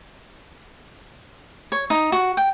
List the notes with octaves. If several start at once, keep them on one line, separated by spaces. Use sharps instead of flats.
C#5
D#4
F#4
G5